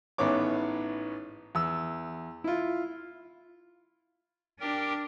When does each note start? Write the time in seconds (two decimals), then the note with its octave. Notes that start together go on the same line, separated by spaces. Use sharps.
0.18 A1 G#2 B3 C#5 D6
1.55 E2 E6
2.44 E4 F4
4.60 D4 G4 A#4 G5